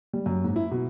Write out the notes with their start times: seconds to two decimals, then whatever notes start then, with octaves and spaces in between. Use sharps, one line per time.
0.13 G3
0.26 F#2
0.44 G#2
0.56 E4
0.72 B2